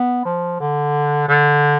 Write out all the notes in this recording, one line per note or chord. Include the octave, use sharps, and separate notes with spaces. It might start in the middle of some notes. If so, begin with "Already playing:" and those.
Already playing: B3
F3
D3
D3